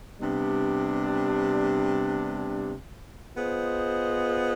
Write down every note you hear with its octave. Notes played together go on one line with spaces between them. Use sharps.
C3 G3 B3 D4
B3 F4 G#4 C5 D#5